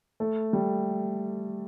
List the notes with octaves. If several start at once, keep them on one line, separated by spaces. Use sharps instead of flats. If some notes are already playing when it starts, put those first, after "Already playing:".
A3
G3